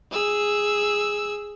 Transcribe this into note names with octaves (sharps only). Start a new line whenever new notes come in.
G#4 E6